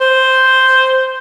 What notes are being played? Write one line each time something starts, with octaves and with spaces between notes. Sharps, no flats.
C5